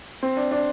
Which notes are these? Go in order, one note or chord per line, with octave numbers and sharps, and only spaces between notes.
C4
D4
D4